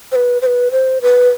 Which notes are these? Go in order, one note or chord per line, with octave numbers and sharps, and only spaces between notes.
C5
B4
C5
B4
C5
B4